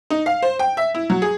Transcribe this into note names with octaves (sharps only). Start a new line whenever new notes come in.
D#4
F5
C5
G5
E5
E4
F#3
G#4